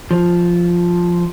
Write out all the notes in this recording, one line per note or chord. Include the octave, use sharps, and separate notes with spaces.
F3